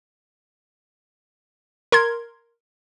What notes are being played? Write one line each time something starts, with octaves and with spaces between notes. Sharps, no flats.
A#4 C6 G#6